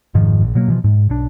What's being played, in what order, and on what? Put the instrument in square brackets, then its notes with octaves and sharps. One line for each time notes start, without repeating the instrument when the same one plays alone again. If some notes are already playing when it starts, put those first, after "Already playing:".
[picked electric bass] F1 G#2 D#3 F3
A#1
B2 F#3 A#3
B2 E3 F3
G#2
B1 D4